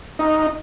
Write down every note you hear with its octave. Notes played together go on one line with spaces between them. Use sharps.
D#4